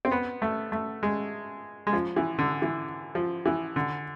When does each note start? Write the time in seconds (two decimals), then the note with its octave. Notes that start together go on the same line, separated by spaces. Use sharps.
0.05 C4
0.12 B3
0.42 A3
0.72 A3
1.03 G#3
1.87 G#3
1.93 F3
2.16 E3
2.39 D3
2.62 E3
3.15 F3
3.46 E3
3.76 D3